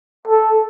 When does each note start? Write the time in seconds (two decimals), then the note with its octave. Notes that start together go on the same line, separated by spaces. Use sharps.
0.27 A4